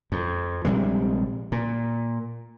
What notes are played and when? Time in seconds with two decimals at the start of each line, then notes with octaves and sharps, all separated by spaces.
0.12 F2
0.65 A#1 C3 G3 G#3
1.52 A#2